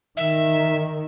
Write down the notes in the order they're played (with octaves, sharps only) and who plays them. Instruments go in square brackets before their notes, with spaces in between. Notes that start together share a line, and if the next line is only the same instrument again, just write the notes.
[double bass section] D#3 [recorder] E5